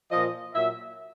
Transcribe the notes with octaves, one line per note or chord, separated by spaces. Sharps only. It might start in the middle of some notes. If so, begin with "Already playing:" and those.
A#2 F3 D#5
A#2 F#3 E5